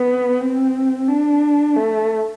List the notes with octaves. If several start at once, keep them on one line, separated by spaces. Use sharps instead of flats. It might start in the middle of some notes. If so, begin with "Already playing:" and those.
Already playing: B3
C4
D4
A3